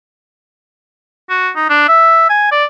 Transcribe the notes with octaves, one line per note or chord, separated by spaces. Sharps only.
F#4
D#4
D4
E5
G#5
D5